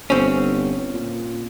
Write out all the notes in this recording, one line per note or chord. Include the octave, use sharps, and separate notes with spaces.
G1 C4 C#4
A#2